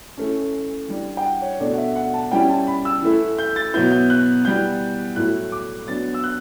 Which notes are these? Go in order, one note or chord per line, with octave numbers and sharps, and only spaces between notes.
E3 A3 C#4
E3 G3 D4
G5
F#5
C#5
B2 A3 D4 D5
F#5
E5
F#5
A5
E3 G3 C#4 E4 G5
A5
B5
E6
E3 A3 E4
G6
A6
B2 F#3 B3 E4 G6
G6
F#6
E3 G3 B3 G6
A2 F#3 A3 E4 F#6
D6
F#3 B3 D4 A6
E6
F#6